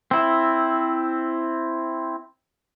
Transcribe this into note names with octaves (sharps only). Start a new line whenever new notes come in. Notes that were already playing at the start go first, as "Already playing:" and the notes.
C4 E4